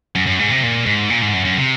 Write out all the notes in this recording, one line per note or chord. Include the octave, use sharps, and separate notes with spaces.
F#2
F#2
G#2
C3
A#2
G#2
A#2
G#2
F#2
F#2
C3